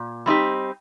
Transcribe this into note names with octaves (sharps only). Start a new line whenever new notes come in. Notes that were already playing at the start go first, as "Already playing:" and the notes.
Already playing: A#2
G3 C4 D#4 G4